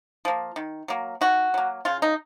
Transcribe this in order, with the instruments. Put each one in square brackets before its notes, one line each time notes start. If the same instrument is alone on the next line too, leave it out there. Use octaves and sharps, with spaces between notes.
[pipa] F3 A#3
D#3
F#3 A#3
D#3 F#4
F#3 A#3
C#3 F4
D#4